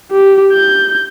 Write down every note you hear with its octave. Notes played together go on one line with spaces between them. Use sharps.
G4
G6